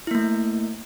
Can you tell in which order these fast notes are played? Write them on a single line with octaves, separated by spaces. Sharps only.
E4 A#3 A3